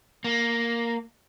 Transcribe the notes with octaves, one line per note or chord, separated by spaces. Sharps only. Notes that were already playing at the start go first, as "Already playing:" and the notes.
A#3